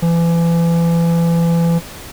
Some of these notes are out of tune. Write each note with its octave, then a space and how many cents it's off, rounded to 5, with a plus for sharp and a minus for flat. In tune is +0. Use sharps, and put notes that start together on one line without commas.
E3 +35